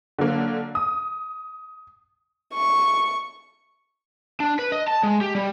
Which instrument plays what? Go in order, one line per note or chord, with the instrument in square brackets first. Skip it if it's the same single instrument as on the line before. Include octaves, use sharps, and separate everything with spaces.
[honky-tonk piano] D3 F#3 A#3
D#6
[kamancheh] C#6
[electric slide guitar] D4
B4
D#5
A5
G#3
G4
G3